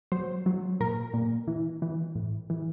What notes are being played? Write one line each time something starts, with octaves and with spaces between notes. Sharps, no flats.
F#3 C5
F#3
A#2 A#4
A#2
E3
E3
A2
E3